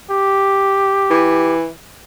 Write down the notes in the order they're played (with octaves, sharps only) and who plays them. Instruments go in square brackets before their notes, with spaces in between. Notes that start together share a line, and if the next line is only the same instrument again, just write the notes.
[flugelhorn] G4
[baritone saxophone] E3